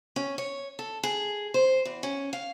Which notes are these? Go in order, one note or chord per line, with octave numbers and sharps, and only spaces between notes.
C#4
C#5
A4
G#4
C5
E2
C#4
F5